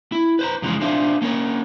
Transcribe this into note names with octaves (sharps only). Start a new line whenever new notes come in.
E4
B4 C5 A#5
F#2 C#3 E3 F3 G#3
D4 F4 C5 E5 F5
A#3 C#4 A#4 C#5